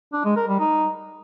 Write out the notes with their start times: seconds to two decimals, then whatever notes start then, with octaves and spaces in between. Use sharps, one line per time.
0.13 D4
0.25 G#3
0.36 A#4
0.48 G3
0.59 D#4